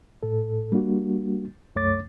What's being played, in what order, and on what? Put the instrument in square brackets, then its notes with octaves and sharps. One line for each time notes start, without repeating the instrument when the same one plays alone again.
[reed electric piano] A2 A4
G3 A#3 D4 F#4
C2 F#2 A3 C#5 D6 A6